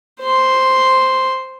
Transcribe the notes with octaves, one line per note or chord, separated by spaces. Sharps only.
C5 C6